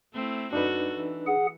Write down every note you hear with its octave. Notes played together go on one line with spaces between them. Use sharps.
A3 C4 E4
F#2 D4 D#4 F#4 A4 B4
E3
G#4 F#5